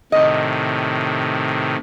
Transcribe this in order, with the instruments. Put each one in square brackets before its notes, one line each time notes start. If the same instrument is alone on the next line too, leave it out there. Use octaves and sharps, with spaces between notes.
[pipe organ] A2 C3 D#3 [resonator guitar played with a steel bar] D#5